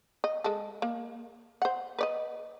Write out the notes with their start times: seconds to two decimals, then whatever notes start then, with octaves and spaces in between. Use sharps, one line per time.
0.24 D#5
0.44 G#3 A4
0.82 A#3
1.62 C5 F#5
1.99 B4 D5 D#5